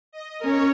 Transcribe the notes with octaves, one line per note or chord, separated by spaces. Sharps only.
D#5
C#4 A#4 C#5